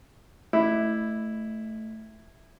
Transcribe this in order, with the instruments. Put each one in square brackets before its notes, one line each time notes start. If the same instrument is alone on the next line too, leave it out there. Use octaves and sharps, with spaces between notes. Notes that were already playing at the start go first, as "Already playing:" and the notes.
[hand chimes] A3 [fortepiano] E4